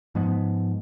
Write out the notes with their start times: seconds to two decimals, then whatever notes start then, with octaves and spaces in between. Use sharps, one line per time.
0.15 G#2 F3 G#3 B3